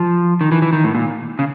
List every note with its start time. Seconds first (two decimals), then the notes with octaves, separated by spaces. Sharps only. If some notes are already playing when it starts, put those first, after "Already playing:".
Already playing: F3
0.41 D#3
0.52 E3
0.62 E3
0.73 D#3
0.84 A2
0.95 A#2
1.39 C#3